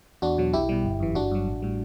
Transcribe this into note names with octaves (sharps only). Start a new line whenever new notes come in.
E2 D4 F#4
B2 F#3
B1 E4 G4
B2 G3
G1
F#2 E3
G1 D4 F#4
G2 F#3
A1
A2 G3